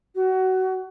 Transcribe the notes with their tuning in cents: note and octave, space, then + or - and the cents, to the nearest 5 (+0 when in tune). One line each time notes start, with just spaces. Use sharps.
F#4 +25